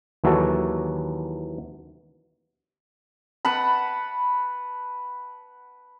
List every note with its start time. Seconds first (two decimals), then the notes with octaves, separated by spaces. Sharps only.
0.24 D#2 E3 F#3 E4 F#4 A4
3.45 B4 F#5 A5 B5